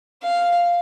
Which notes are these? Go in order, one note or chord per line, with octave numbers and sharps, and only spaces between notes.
F5